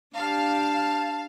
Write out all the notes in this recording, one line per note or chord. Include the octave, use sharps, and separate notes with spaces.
D4 G4 F5 A5